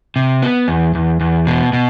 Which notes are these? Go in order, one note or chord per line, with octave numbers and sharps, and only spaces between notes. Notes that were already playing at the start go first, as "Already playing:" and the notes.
C3
B3
E2
E2
E2
B2
B2